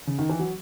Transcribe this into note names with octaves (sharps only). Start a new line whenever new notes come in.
C#3
D#3
E3
F#3